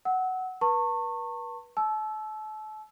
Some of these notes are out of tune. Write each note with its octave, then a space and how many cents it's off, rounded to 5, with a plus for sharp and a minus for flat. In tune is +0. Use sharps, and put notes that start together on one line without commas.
F#5 +10 E6 -30
B4 -35 A5 +40 C#6 -25
A5 -35 E6 +0